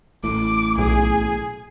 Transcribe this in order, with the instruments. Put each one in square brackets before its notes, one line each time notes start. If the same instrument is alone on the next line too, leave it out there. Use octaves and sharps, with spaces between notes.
[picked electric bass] A1 A2 [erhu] D6
[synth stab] B1 [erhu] G#4